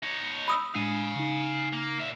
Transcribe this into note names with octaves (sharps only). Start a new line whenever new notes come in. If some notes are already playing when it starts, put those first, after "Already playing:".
D#4 C#5
B5 D#6 E6
A2 G#3 D4 F5 G#5
C#3 D#4
A#3
A#2 E5